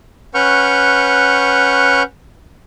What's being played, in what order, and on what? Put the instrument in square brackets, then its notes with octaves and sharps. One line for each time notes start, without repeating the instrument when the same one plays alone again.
[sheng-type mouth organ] C#4 B4 F#5 C#6 F6 G6